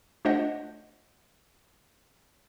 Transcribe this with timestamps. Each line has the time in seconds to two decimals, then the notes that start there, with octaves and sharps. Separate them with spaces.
0.25 A3 D4 F4 C5 D#5 F#5